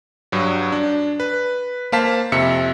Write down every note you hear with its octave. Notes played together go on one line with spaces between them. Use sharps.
G2 F#3
D4
B4
A#3 C5 F5 A5 B6
F2 C3 E5 C#7